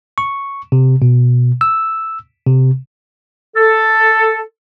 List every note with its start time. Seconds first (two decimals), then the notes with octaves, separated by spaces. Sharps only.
0.18 C#6
0.72 C3
1.02 B2
1.61 E6
2.47 C3
3.56 A4